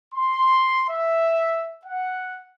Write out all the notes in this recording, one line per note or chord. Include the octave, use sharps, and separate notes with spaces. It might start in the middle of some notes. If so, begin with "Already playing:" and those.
C6
E5
F#5